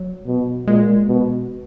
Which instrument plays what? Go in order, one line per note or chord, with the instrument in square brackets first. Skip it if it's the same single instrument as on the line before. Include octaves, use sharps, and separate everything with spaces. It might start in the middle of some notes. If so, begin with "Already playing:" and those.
Already playing: [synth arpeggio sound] F#3
[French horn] B2
[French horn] A#2 [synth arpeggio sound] G#3
[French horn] B2